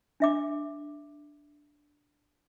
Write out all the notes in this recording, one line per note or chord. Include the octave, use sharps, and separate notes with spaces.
D4 E5 D6